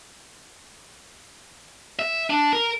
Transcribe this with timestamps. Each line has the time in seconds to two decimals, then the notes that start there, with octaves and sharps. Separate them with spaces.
1.99 E5
2.30 D4
2.53 A#4